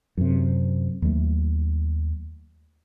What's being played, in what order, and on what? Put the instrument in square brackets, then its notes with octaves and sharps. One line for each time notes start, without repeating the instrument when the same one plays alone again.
[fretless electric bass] F#2 C3
D#2 F#3 G3 A3